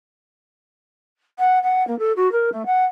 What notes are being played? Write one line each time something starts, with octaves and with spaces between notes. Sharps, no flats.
F#5
F#5
A#3
A4
F#4
A#4
A3
F#5